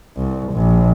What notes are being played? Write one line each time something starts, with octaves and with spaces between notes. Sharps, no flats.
C2
A#1